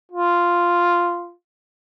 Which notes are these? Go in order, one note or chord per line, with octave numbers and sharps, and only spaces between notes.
F4